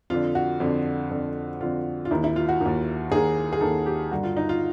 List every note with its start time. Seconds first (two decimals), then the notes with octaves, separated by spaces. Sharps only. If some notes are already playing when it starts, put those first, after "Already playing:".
0.10 F2 D3 F4
0.35 F#4
0.60 F2 D3
1.10 F2 D3
1.61 F2 D3 F4
2.05 F4
2.11 D#2 D#3 E4
2.24 E4
2.36 F4
2.49 F#4
2.61 D#2 D#3
3.11 D#2 D#3 G#4
3.53 G#4
3.61 D#2 D#3 A4
3.86 G4
4.11 G2 D3 F#4
4.23 F4
4.37 D#4
4.49 F4